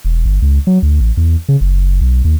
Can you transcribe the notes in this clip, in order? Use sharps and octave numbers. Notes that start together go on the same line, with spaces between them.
E1
G1
C#2
F#3
D2
A1
E2
C#3
F#1
B1
D#2